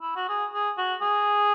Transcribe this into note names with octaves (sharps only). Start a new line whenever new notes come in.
E4
F#4
G#4
G#4
F#4
G#4